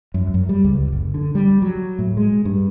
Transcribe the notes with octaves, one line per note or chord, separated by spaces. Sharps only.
F#2
F#2
G3
C#2
F#1
D3
G3
F#3
A2
G#3
G2